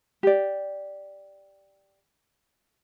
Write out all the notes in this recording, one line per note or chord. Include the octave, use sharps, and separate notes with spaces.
G4 D5